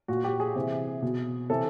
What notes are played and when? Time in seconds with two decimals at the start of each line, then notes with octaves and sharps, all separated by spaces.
0.08 A#2 F#4
0.24 G4
0.40 G#4
0.56 C3 E3
1.02 B2
1.50 C3 E3 A4